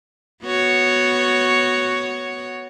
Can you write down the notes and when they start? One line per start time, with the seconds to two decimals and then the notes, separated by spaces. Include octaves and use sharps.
0.45 B3 F#4 C#5